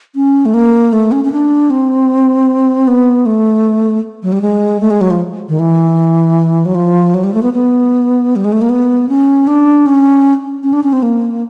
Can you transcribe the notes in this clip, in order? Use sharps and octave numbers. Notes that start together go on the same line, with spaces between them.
C#4
A3
A#3
A3
C#4
C#4
D4
C4
B3
A3
F#3
G3
G#3
A3
G#3
F#3
F3
D#3
E3
F#3
F3
F#3
G3
A3
B3
B3
G3
G#3
A3
A#3
B3
C#4
D4
C#4
C#4
D4
C#4
C4
A#3